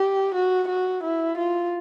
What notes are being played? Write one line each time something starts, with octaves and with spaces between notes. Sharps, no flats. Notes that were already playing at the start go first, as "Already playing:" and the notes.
Already playing: G4
F#4
F#4
E4
F4